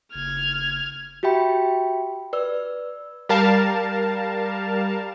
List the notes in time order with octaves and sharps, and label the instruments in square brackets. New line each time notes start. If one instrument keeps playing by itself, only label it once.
[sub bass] F#1 [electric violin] F6 G#6
[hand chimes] F#4 G4 E5 G5 B5
B4 D5 E6
[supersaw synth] G3 A#4 F5 A5